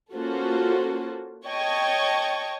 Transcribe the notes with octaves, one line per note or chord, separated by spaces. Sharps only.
A#3 C#4 F4 F#4 A4 C5
C#5 D#5 G5 A5 C#6 G#6